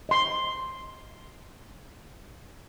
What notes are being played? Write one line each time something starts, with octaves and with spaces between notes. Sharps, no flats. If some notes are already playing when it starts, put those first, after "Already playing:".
D#5 C6